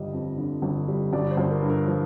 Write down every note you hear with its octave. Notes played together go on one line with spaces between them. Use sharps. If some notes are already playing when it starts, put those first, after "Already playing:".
Already playing: G1 G3 D#5
F2
D3
G1
G3
G1 D5
C5
G1
A#4
G2
A#4
F3